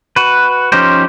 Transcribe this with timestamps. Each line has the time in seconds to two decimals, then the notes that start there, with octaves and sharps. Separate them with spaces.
0.16 F#4 B4
0.72 F3 C#4 D#4 G4 C5